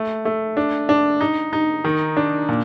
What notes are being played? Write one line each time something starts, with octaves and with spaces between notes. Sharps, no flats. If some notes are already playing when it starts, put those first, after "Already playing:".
Already playing: A3
A3
D4
D4
D#4
D#4
D#3
D4
A#2